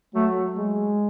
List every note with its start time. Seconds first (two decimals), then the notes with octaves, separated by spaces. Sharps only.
0.14 F#3 A3
0.57 G#3